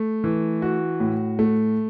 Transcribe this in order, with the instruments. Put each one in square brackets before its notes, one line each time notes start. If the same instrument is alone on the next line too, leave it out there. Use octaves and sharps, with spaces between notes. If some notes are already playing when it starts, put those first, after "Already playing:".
Already playing: [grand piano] A3
E3
F#4
A2
A3